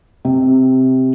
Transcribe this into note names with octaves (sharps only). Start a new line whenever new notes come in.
C3